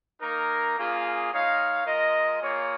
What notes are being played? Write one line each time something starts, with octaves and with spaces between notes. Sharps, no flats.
A#3 D#4 A#4
A#3 C#4 F4 G#4
G#3 D#4 C#5 F5
G#3 F4 A#4 D#5
A#3 F4 G#4 C#5